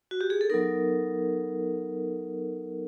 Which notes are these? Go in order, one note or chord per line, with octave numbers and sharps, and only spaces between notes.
F#4
G4
G#4
A4
F#3 B3 D#4 A#4